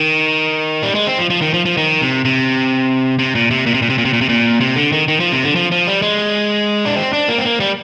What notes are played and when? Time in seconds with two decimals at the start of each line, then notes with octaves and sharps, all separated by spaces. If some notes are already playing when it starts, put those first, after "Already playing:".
Already playing: D#3
0.83 G3
0.95 G#3
1.07 C4
1.18 F3
1.30 F3
1.41 D#3
1.54 F3
1.65 F3
1.77 D#3
2.01 C3
2.25 C3
3.19 C3
3.35 A#2
3.51 C3
3.66 A#2
3.74 C3
3.82 A#2
3.90 C3
3.98 A#2
4.05 C3
4.13 A#2
4.21 C3
4.29 A#2
4.60 C3
4.76 D3
4.92 D#3
5.08 D#3
5.20 F3
5.32 C3
5.44 D3
5.56 F3
5.72 F3
5.87 G3
6.02 G#3
6.85 D4
6.96 C4
7.13 D4
7.28 A#3
7.38 C4
7.44 A#3
7.60 G3